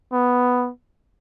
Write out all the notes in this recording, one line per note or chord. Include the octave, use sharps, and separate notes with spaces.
B3